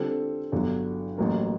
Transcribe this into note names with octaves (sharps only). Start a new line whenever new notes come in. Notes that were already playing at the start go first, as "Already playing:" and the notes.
Already playing: D3 G3 C4 F4 A4
G1 G2 D3 F#3
A1 A2 F#3 A#3